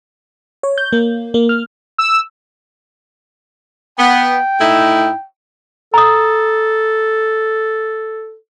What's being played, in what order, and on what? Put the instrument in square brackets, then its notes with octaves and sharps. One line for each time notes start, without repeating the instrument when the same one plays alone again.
[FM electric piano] C#5
G6
A#3
A#3
F6
[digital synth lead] E6
[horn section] B3 [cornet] G5
[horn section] A2 D#4 E4
[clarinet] A4 [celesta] A#5 D#6